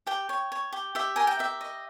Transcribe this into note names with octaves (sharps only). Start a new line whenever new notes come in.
G4 G5
C#5
C#5
G4
G4 E5
A#4 G#5
G5
G4 E5
D#5